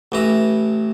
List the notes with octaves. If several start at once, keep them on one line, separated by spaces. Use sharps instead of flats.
A1 E3 A#5